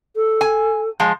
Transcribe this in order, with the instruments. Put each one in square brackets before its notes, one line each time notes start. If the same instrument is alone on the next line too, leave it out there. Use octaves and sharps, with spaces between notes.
[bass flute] A4
[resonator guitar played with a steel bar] G#5
F3 G#3